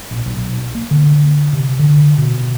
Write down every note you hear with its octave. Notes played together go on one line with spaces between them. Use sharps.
A#1
B1
A#3
D3
C3
D3
B2